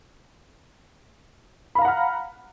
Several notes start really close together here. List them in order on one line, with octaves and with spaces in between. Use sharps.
B5 F5 A#5 F#5 F6